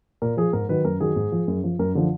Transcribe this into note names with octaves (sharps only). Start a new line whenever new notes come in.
A#2 A#4
F3 G#4
G#2 A#4
D#3 F#3 B4
F#2 A#4
D#3 F#3 G#4
G#2
F3
F#2
F3
F#2 A#4
D3 F3